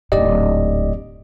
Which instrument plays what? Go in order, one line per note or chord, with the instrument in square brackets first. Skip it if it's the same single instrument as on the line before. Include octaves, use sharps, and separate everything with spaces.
[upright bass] D1 G#2 [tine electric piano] G4 D5 D#5